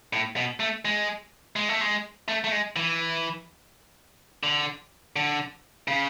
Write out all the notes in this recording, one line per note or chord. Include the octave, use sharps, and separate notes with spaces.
A2
B2
A3
G#3
G#3
A3
G#3
A3
A3
G#3
E3
D3
D3
C#3